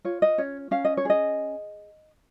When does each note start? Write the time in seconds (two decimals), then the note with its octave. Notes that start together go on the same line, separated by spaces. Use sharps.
0.05 F4 C#5
0.22 D#5
0.38 C#4 C#5
0.71 C#4 F5
0.85 D#5
0.97 C#5
1.05 G#4 D#5